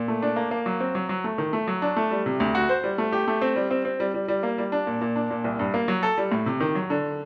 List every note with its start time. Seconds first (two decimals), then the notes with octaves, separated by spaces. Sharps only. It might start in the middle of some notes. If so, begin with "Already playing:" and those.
Already playing: A#2
0.08 A3
0.22 D4
0.36 A#3
0.51 A#3
0.66 F#3
0.80 C4
0.95 F#3
1.09 F#3
1.24 A3
1.38 D#3
1.53 A3
1.68 F#3
1.82 D4
1.96 A3
2.11 G3
2.26 C3
2.40 D2
2.55 F#4
2.69 C5
2.84 G3
2.98 A3
3.12 G4
3.28 A3
3.42 C4
3.56 G3
3.71 C4
3.85 C4
4.00 G3
4.14 G3
4.28 G3
4.43 A#3
4.58 G3
4.72 D4
4.87 A#2
5.01 A#2
5.16 D4
5.30 A#2
5.44 C2
5.59 G2
5.74 A#3
5.88 F#3
6.03 A4
6.18 G3
6.32 A2
6.46 C3
6.60 D#3
6.75 F#3
6.90 D3